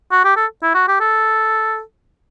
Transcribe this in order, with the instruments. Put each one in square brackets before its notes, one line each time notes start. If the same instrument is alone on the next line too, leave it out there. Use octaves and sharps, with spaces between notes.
[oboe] F#4
G4
A4
E4
F#4
G4
A4